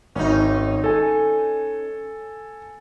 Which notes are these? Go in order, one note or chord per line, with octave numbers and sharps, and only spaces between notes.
G#1 C#4 D#4
A4 G#5